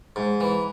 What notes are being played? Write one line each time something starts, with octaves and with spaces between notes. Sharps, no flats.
G#2
E3